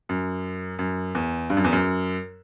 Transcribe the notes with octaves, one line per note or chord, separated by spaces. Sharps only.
F#2
F#2
E2
G2
F#2
E2
F#2